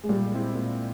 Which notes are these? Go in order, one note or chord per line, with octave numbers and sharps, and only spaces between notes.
G#3
A#2 G3
G#3 C4 E4
A#2